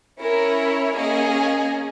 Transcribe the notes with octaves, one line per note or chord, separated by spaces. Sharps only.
C#4 E4 A#4 C#5
A#3 C#4 G#4 D#5